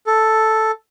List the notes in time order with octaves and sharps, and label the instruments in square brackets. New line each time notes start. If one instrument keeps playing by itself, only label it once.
[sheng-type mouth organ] A4